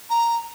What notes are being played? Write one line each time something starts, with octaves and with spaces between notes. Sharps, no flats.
A#5